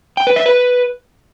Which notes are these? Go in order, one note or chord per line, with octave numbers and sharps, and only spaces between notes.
G5
B4
E5
B4